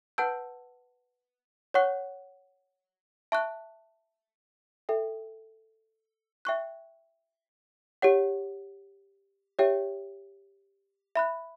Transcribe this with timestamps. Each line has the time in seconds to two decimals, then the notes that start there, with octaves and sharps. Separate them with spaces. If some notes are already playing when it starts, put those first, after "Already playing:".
0.18 B4 F#5 A5 E6 G6
1.74 C#5 F#5 C#6 F#6
3.32 E5 A5 C#6 F#6
4.89 A4 E5 G5
6.45 E5 G5 C#6 F#6
8.02 G4 C#5 F#5
9.59 G4 C#5 E5 G5
11.16 E5 B5 F#6